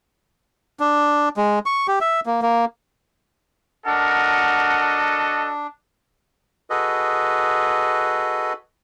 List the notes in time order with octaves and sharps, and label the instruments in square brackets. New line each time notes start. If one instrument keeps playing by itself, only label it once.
[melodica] D4
G#3
C#6
G4
E5
A#3
A#3
[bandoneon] D4 [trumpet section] F#4 A4 D#5 [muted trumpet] A#4 [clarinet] F#5
[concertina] F#4 G#4 A4 B4 D#5